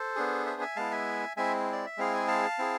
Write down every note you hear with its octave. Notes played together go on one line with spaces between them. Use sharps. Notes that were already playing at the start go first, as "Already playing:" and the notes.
Already playing: A4 C5
B3 D4 G#4
C5 E5
E5 G#5
G#3 B3 E4 F5 A5
E5 G#5
G#3 C4 E4 E5 G#5
D5
E5
G#3 C4 E4 G#4 F5
G#5
F5 A5
C4 E4 G#4